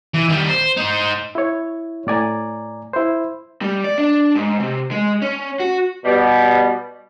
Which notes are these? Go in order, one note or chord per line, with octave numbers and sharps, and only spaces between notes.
E3
D#3 G3
C5
D#4 C5
E4 C#5
A2 D5 G#5 A#5
E4 C5
G3
D5
D4
G#2
C3
G#3
C#4
F#4
B2 G3